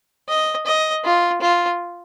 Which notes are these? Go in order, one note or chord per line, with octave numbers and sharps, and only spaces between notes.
D#5
D#5
F4
F4